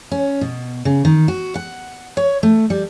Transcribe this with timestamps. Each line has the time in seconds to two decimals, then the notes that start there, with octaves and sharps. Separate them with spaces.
0.12 C#4
0.41 B2
0.85 C#3
1.05 D#3
1.28 F#4
1.55 F#5
2.17 C#5
2.43 A3
2.70 G3